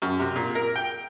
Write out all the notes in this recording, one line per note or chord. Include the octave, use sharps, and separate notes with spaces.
F#2
C3
A#2
A#4
G5